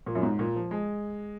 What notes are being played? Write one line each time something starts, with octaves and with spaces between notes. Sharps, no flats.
A#2
F#2
G#2
A#2
F3
G#3